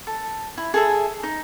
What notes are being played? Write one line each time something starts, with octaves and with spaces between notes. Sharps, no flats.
A4
E4
G#4 A4 E5
D#4